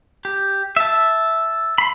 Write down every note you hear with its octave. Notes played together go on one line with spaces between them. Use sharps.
G4
E5 A5
B5 C6